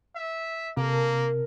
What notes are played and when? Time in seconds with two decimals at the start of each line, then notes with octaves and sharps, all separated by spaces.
0.15 E5
0.77 C3 A#3 A#4 A5